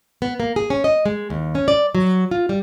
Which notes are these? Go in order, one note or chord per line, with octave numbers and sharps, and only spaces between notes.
B3
A#3
G#4
C#4
D#5
G#3
D#2
C#4
D5
F#3
F4
G3